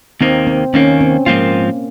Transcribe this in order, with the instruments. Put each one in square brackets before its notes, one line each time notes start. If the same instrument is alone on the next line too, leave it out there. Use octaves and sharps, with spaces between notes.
[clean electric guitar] D#2 D#3 A#3 [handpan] C4
[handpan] C4
[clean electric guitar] D#2 D#3 A#3 [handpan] C#4
[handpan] C4
[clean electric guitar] G#2 F3 C4 F4 [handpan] A#3